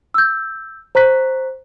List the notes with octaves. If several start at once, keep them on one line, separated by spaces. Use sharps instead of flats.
E6 G6
C5 A#5 C#6 F#6 B6